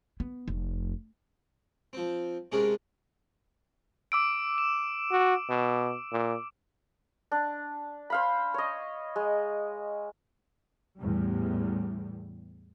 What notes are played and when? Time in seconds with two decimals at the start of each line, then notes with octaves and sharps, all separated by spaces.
0.20 B3
0.48 F1
1.93 F3 C4
2.52 C3 G#3 A#3 C#4 D4 G#4
4.12 D6 E6 D7
4.58 E7
5.11 F#4
5.50 B2
6.13 A#2
7.32 D4
8.10 C5 F5 B5
8.54 C#5 D#5
9.16 G#3
10.99 E2 A2 G3